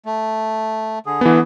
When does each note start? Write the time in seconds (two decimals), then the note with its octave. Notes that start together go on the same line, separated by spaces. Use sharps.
0.06 A3
1.06 D3 G#4
1.21 E3 B3